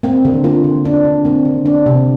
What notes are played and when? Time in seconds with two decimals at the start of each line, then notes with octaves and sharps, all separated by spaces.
0.03 A#3 C4
0.25 D3
0.44 A#3 F4
0.64 D3
0.84 A#3 D4
1.05 D3
1.25 A#3 C4
1.45 D3
1.66 A#3 D4
1.86 C3 C4